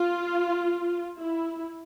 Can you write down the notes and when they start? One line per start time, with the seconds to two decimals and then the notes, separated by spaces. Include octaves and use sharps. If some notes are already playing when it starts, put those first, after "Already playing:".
Already playing: F4
1.16 E4